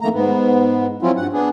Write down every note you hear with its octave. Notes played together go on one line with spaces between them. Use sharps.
F2 D#3 A3 A#3 A#5
G#2 B3
F3 F#3 C4 C#4 E4 F4
G2 F#5
B3 D4 G#4